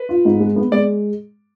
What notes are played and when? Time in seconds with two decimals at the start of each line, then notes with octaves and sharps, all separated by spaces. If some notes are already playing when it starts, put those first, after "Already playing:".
Already playing: B4
0.09 F4
0.25 G#2
0.40 G#3
0.56 B3
0.72 G#3 D5